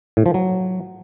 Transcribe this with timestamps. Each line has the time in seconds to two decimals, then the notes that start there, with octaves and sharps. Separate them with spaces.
0.17 A2
0.26 F3
0.34 F#3